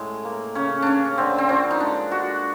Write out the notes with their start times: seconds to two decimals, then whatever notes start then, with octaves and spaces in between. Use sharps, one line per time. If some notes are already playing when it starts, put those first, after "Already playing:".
Already playing: A2 G#3
0.25 A#3
0.55 C#3 C#4
0.82 C#3 C#4 D4
1.18 D3 C4
1.38 C4
1.49 F3 C#4
1.71 D#4
1.80 G#3 D4
2.11 G#3 F#4